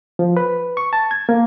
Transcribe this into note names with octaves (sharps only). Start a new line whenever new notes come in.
F3
B4
C#6
A5
G#6
A#3